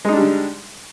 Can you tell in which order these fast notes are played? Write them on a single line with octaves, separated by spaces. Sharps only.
G#3 D#4 D4 G3 D3